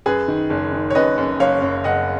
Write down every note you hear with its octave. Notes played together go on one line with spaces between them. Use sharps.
F#2 G#4 B4
D#3
F#1
D#3
C#5
F#2 B4 D#5
F#2
F#1 C#5 F5
F#2
F#1 D#5 F#5